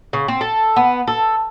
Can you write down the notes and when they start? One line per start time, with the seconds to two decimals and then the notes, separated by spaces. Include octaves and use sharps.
0.13 C#3
0.28 C4
0.41 A4
0.76 B3
1.07 A4